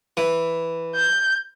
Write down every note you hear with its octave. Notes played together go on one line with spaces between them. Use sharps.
E3
G6